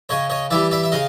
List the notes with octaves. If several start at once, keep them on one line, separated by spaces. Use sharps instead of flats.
C#3 C#5 D#5
C#5 D#5
E3 G3 D5 E5
D5 E5
E5
C#3 D#5 F5